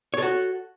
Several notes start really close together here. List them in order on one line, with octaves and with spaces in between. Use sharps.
C#5 A4 F#4